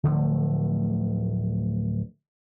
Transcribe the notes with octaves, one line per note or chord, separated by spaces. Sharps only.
D1 D3 F3 A3